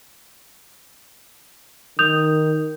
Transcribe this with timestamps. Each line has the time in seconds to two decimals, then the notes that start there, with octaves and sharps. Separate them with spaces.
1.99 D#3 D#6 G6 F7